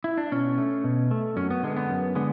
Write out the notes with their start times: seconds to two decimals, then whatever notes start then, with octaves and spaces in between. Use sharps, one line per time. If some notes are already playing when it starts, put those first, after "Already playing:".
0.04 E4
0.18 D4
0.32 B2 C#4
0.58 A3
0.84 B2
1.11 A3
1.36 F#2 C#4
1.51 B3
1.63 D3 G#3 B3
1.77 B3
1.90 F#2
2.15 D3 G#3 B3